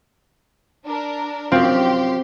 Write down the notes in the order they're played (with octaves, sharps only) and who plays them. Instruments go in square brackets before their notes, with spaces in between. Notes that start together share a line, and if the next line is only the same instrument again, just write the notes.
[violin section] D4 A#4
[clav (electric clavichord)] F#2 F4 [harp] C4 [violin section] G4 C6